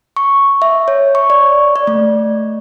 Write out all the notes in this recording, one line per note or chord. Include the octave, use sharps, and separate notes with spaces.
C#6
E5
C#5
C#6
D5
D5
A3